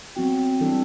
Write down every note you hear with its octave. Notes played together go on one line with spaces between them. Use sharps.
F#3 B3 C4 F#4
E3 G3 D4 A4